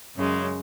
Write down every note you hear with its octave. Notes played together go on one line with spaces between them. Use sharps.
F#2 C#3 G#3